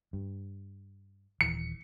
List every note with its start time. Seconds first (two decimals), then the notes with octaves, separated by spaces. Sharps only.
0.13 G2
1.41 D#1 E3 C#7